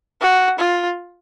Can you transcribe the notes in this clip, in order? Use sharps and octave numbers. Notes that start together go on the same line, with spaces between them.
F#4
F4